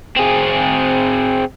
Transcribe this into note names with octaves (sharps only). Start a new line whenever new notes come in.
C4 G#4